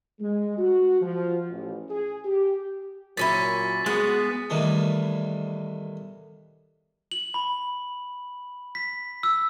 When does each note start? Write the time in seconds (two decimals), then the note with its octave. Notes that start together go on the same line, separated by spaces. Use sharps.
0.20 G#3
0.58 F#4
1.02 F3
1.50 A1
1.90 G#4
2.25 G4
3.17 A#2 F#3 C#4 E4 A6 B6
3.86 G#3 B3 F#4 G#4
4.50 E2 A2 D#3 G3 B3 D4
7.12 F#7
7.34 B5
8.75 B6
9.23 E6